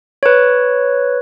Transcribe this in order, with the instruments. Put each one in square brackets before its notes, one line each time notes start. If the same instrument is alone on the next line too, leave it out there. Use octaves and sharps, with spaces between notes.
[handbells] B4 C#5